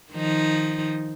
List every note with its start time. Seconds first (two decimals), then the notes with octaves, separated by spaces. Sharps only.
0.12 D#3 F3 D#4